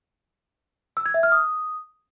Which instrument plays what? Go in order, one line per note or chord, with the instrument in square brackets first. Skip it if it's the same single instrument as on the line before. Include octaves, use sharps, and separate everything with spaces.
[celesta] E6
G#6
E5
F6
D#6